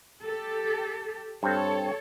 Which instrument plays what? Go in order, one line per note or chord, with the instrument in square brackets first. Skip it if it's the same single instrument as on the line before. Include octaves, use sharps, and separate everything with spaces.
[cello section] G4 A4
[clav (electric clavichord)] G2 C4 [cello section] A4 C#5